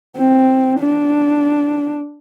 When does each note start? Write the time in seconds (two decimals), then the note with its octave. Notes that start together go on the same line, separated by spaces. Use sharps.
0.17 C4
0.79 D4